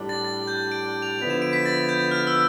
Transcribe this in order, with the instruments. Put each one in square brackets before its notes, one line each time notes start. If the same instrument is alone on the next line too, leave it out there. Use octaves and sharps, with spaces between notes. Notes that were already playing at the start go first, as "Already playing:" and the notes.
Already playing: [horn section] A2 G3 D4
[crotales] A6
A6
G6
D7
F7
[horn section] D3 F3 B3 E4 [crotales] F7
[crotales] E7
D7
B6
A6
G6
F6
E6